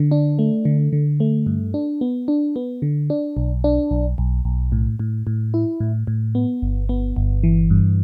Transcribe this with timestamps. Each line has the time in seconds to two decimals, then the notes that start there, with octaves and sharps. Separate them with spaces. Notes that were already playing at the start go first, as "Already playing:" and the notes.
Already playing: D3
0.11 D4
0.39 A3
0.65 D3
0.93 D3
1.20 A3
1.46 G2
1.74 D4
2.01 B3
2.28 D4
2.56 B3
2.82 D3
3.10 D4
3.37 B1
3.64 D4
3.91 B1
4.18 B1
4.45 B1
4.72 A2
4.99 A2
5.27 A2
5.54 E4
5.80 A2
6.07 A2
6.35 B3
6.62 G1
6.89 B3
7.16 G1
7.43 E3
7.71 G2